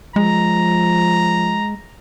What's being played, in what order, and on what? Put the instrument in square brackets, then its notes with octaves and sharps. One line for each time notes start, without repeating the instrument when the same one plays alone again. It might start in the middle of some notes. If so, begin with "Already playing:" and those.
[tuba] F3 [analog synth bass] G#3 [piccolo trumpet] A#5